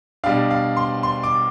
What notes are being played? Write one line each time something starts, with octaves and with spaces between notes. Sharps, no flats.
B2 G3 D4 F5
F5
C6
C6
D6